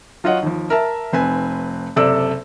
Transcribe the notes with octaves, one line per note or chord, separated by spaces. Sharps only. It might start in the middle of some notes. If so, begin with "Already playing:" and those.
F#3 F4 C#5 D#5 F#5
D#2 F3
A#4 E5 A5
F1 C4 B4 G#5
F#1 C3 A4 D5 E6